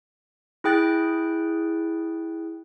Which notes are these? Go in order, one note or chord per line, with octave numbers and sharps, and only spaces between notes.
E4 G#4 G5 F#6 A6